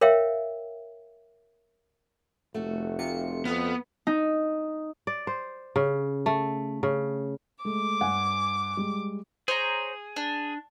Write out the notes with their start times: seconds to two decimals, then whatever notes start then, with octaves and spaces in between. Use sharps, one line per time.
0.01 A#4 C#5 E5 F5 G5
2.54 F1 A3 F#4
2.99 C3 F4 C#7
3.45 F2 B3 D#6 F6
4.07 D#4
5.07 D5
5.27 C5
5.76 C#3
6.26 A3
6.83 C#3
7.65 G#3 A3 D6
8.01 G2 F#5 G#5
8.77 G3 G#3
9.48 G#4 C5 C#5 A#5
10.16 D4